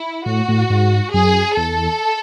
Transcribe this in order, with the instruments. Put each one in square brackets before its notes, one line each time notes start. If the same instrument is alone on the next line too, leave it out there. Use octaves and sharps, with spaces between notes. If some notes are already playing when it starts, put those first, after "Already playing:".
Already playing: [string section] E4
[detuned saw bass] A2 [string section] F#4
[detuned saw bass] A2
G#2
[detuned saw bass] F#2 [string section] G#4
[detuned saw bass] E2 [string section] A4